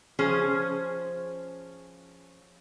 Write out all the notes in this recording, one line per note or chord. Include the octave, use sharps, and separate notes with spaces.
F3 C#4 G#4 C5